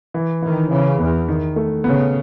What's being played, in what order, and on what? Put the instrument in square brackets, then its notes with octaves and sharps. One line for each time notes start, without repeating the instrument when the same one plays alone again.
[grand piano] E3
[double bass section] D#3 [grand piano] E3
[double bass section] C#3 [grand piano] E3
[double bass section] E2 [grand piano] B3
[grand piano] D#3
A3
[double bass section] C#3 [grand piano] B3